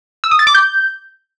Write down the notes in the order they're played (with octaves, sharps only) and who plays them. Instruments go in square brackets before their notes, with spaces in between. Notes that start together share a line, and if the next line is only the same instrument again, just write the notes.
[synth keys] E6
D#6
A6
D6
G6